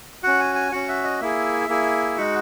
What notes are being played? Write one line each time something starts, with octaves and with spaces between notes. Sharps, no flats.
C#4 F#4 F#5
G#5
G#5
C#4 F#4 F#5
E5
D#5
A#3 E4 G#4 E5
A#3 E4 G#4
G#3 D#4 F#4 F#5